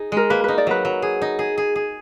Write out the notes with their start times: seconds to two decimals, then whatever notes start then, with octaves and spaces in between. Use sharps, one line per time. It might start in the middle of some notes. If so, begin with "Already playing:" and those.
Already playing: D#4 G#4
0.12 G#3 A#4
0.30 A#3 B4
0.44 D#4 B4
0.58 D5
0.67 F#3 B4
0.85 F#3
1.02 G#4
1.22 D#4
1.39 G#4
1.58 G#4
1.75 G#4